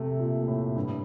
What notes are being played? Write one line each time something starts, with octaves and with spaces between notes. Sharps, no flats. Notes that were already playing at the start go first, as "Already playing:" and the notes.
Already playing: C3 A3
A#2
A2
G2